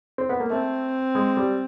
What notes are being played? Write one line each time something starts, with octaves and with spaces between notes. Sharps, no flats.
C4
B3
A#3
A3 C4
G#3
G3